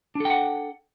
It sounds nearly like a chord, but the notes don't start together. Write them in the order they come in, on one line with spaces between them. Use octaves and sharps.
D4 A4 G5 F#5